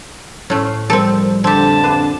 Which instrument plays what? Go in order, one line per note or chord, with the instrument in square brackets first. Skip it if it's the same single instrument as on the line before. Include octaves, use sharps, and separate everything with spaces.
[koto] A2 A3 [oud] C#4 C5
[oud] F3 G3 A#4 [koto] C4 A4
[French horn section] F2 D3 [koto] C4 G4 [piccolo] A5
[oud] D4 E4 B4